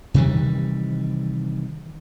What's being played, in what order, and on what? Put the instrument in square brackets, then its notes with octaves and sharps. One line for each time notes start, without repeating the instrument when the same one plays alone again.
[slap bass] C3 D#3 E3 G3